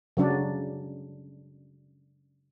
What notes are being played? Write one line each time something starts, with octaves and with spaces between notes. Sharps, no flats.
C#3 F#3 D4